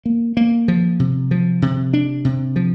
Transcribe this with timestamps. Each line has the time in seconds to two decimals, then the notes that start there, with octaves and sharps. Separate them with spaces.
0.05 A#3
0.37 A#3
0.68 F3
1.00 C3
1.31 F3
1.62 C3
1.93 D4
2.25 C3
2.56 F3